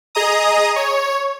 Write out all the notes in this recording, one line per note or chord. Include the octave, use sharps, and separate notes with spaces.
G#4 D#5 A#5 D#6
C#5